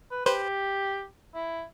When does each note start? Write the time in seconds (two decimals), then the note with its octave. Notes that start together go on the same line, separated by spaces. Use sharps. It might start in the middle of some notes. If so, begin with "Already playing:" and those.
0.11 B4
0.26 G4 B4 C5
1.35 E4